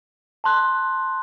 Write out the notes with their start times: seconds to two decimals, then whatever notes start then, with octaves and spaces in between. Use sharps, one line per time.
0.44 A5 C6 F#6